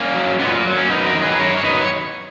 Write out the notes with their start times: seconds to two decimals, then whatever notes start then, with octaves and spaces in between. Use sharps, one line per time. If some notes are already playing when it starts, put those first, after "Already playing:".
Already playing: A#3 C#4
0.15 F#3
0.39 A#2 G#3 B3
0.52 A#3
0.65 F#3
0.77 A#3 C#4
0.89 F#2 B3 D#4
1.06 F#4 A#4
1.14 D#3 F#3
1.22 G#4 B4
1.39 F#2 A#4 C#5
1.58 C#5
1.64 D#3 F#3 B4 D#5
1.81 C#5